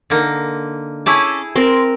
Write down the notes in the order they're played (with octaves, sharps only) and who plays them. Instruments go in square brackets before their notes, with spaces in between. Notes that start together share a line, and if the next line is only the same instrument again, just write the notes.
[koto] D3 A#3 D#4
[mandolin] C#4 A4 D6 [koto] E4 G#4 A5
[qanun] C4 A#4 [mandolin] C6